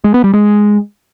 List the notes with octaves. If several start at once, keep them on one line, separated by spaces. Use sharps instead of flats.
G#3
B3
G3
G#3